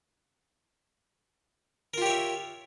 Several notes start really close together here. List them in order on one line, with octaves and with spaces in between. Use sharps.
A#4 F4 G4 C#5 E5